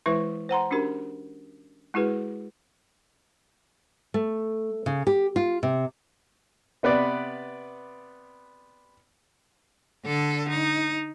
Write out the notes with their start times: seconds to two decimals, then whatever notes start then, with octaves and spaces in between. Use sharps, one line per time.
0.06 E3 G#3 E4 B4 E5 C#6
0.49 C5 F#5 A#5 C6
0.71 C#4 D4 F#4 G4 A#4
1.94 G#3 E4 F#4 G#4 B4
4.14 A3
4.86 C#3
5.07 G4
5.36 F4
5.63 C3
6.83 C3 B3 B4 D5
10.05 D3 A4
10.50 D#4